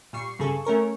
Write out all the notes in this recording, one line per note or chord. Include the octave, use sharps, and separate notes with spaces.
A#2 G3 C#6 C7
G2 C#3 G3 G#4 A4 C#6
A3 C#4 A#4 C#6